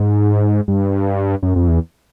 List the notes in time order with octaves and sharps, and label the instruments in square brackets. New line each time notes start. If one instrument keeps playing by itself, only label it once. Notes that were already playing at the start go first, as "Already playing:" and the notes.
Already playing: [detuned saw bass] G#2
G2
F#2
F2
E2